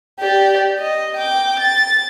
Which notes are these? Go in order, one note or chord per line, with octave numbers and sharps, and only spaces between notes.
G4 D5
D#5
G5 D6
A6